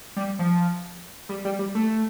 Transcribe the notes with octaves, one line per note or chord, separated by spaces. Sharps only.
G3
F3
G3
G3
G3
A3